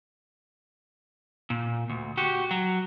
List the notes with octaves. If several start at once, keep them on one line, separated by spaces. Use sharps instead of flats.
A#2
D2
F#4 G4
F#3